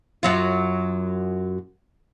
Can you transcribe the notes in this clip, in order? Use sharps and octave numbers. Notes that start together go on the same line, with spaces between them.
F#2 F#3 F4